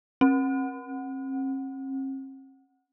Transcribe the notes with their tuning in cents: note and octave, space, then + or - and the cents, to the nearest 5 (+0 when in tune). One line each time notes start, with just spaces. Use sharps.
C4 +45